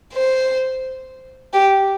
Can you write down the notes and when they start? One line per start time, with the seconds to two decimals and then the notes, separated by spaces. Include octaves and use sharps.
0.13 C5
1.53 G4